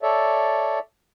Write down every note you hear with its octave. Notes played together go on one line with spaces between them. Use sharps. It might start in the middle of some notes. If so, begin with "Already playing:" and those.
A4 C#5 D5 E5